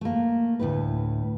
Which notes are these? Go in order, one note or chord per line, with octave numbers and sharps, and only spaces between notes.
A3 A#3
D2 A2 B4